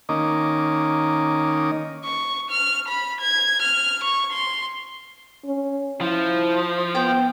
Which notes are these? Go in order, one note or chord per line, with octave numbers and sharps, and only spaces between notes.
D#3 A#3 C#4 D#5 D6
C#6
F6
B5
G#6
F6
C#6
C6
C#4
F3 E4
B3 G5